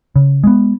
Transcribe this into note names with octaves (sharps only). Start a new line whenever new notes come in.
C#3
G#3 B3